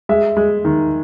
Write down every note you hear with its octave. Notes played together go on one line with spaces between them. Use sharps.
G#3 E5
G#3
D#3